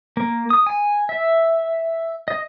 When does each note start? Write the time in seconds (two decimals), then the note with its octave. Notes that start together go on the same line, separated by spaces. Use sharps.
0.17 A#3
0.50 D#6
0.66 G#5
1.09 E5
2.28 D#5